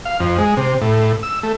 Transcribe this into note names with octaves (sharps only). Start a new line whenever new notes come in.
F5
F2
G#3
C3
A2
E6
A3